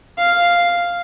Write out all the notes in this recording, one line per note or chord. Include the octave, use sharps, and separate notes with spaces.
F5